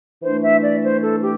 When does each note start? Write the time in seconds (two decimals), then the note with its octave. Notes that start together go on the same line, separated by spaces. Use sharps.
0.23 E3 A3 D4 C5
0.43 E5
0.63 D5
0.83 C5
1.02 A4
1.22 G4